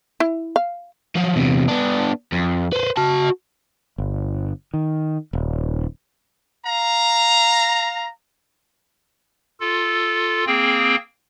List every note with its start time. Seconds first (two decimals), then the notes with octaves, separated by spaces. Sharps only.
0.20 E4
0.56 F5
1.15 F3 F#3
1.36 E2 C3
1.69 B3 D4
2.32 F2
2.73 B4 C5
2.97 F#4 A5
3.98 G1
4.74 D#3
5.33 D#1
6.66 F5 A#5
9.60 F4 A4
10.46 A#3 C4 G#4 G5